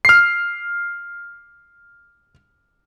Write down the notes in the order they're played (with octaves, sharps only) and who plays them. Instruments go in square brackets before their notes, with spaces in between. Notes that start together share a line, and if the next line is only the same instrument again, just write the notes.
[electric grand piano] F6 C7